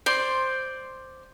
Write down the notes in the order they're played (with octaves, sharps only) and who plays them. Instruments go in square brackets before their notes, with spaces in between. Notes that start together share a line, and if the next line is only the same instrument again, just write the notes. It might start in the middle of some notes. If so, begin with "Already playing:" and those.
[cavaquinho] C5 D5 C6